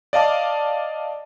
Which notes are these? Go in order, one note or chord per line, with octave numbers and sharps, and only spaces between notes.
D5 D#5 F5 A5 D6